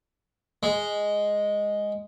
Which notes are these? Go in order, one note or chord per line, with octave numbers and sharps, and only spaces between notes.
G#3